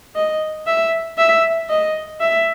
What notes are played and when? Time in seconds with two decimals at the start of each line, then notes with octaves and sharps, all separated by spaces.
0.15 D#5
0.66 E5
1.18 E5
1.69 D#5
2.20 E5